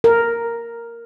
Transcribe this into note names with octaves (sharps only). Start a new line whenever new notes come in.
A#4